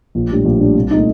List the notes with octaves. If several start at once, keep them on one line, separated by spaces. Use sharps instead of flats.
A#1
A2 G3 D4
A#1
A2 G3 D4
C2
A#2 A3 D#4